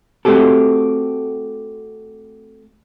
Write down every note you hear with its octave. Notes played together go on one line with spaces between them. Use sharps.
A3 C4 F#4 G4 A4